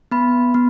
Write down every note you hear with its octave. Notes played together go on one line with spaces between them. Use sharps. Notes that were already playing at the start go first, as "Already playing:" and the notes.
B3 B5
B3